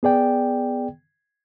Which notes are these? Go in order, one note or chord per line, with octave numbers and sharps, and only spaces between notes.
B3 G#4 D5 G5